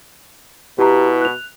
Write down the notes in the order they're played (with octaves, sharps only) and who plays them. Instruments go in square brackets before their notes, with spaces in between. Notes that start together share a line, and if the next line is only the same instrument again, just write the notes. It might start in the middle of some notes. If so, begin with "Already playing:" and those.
[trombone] B2 [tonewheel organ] E4 B4 [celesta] G4 A#5
[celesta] F#6 F7